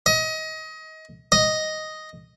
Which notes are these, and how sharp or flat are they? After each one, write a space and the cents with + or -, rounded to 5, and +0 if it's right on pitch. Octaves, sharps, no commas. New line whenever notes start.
D#5 +25
D#5 +0